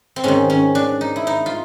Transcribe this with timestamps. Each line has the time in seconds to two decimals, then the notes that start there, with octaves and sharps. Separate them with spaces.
0.16 C4
0.24 G#2 D#3 C#4
0.50 C#4
0.75 D4
1.01 D#4
1.16 E4
1.27 D#4
1.46 F4